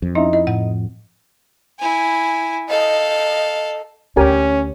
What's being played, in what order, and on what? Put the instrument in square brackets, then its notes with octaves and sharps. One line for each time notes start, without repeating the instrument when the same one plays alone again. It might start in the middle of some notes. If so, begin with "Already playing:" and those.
[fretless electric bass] F2
[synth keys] C#4 E5 A#5 [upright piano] D#4 [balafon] E4
[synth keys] E4 [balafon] D#5
[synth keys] A2 [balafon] F#5
[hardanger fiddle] E4 G#5
[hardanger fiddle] A4 F5 [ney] D#5
[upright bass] D2 [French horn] C#4 [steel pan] G4 A#4 G#5